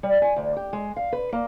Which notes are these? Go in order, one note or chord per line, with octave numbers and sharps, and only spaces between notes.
G3
G#5
D2
G4
G#3
F5
B4
A#3